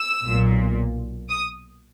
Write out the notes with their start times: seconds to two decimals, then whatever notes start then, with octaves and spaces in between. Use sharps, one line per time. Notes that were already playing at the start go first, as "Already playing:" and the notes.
Already playing: E6
0.25 B1 A#2
1.30 D#6